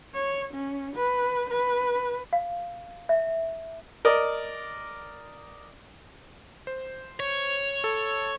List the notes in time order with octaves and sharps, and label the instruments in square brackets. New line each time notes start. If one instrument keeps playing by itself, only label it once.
[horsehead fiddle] C#5
C#4
B4
B4
[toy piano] F5
E5
[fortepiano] A#4 D5 D#5
[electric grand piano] C5
[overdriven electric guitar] C#5
[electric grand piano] A4